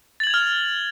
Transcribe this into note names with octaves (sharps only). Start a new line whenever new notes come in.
F6 G#6 A6 F7 F#7